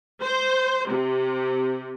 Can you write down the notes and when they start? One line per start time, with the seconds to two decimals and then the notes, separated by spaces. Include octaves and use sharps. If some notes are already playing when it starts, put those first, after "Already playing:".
0.22 C5
0.89 C3